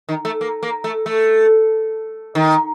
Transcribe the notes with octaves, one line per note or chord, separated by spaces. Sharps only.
D#3
A3
A#3
A#3
A3
A3
D#3